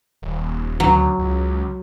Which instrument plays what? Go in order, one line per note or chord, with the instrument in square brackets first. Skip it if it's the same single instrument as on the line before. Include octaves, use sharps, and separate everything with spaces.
[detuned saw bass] D#1
[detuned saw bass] D2 [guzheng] F#3
[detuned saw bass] C#2